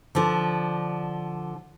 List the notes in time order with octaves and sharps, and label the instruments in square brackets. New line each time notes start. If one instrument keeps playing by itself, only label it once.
[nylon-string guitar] D3 F3